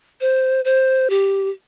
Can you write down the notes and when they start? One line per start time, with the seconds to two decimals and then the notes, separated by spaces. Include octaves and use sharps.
0.21 C5
0.65 C5
1.10 G4